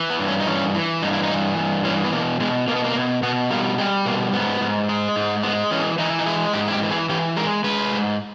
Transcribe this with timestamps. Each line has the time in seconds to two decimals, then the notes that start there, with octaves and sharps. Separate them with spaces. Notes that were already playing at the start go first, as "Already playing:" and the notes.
Already playing: E3
0.10 B3
0.19 G2
0.29 C#4
0.40 D#4
0.47 E3 C#4
0.75 E3
1.03 G2 D#4
1.13 E4
1.23 D#4
1.30 E3
1.57 G2
1.84 E3 C#4
2.05 B3
2.12 B2 A#3
2.40 B2 G#3
2.68 B2 A#3
2.76 B3
2.84 A#3
2.96 B2
3.23 B2 B3
3.50 G3 A#3
3.78 G3 G#3
4.06 B2 A#3
4.33 G#2 B3
4.61 G#2
4.89 G#3
5.16 G#2
5.43 G#3 B3
5.71 E3 C#4
5.98 E3 D#4
6.19 D#4
6.26 G#3 E4
6.53 G#2 G4
6.68 E4
6.72 G4
6.82 E3
6.91 G#4
7.09 E3 G4
7.36 G#3 A#4
7.64 G#3 B4
7.92 G#2